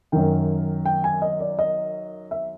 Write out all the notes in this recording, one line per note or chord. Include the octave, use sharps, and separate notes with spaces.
F#2 D#3 G5
G5
G#5
D#5
D5
D#5
E5